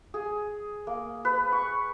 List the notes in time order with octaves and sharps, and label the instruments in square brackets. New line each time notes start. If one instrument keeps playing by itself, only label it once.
[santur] G#4
A#3
B4
C#6